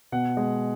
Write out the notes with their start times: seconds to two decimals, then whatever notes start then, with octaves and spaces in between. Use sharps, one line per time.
0.12 B2 F#5
0.37 G#3